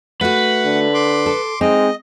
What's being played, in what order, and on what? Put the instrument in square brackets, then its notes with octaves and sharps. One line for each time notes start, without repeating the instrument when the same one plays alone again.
[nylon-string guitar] A3 F#4 [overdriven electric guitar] B4 [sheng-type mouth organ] F#5
[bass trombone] D3
[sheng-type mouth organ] C6 D6
[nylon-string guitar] A4
[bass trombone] G#3 [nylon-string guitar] C4 D#4 [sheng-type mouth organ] D#5